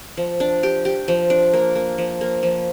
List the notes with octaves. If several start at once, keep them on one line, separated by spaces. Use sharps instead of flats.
F3
D4
G4
G4
F3
D4
A#3
A#3
F3
A#3
F3